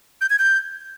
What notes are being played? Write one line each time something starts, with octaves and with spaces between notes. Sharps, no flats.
G6
G#6
G6